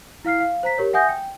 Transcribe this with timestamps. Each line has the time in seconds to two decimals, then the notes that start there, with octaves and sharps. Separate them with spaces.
0.25 E4 F5 F6 C7
0.40 F5
0.63 C5 A#5 B6
0.78 G4 A#4 C#5
0.93 E5 F#5 G#5 D#6 G6 A#6
1.09 G5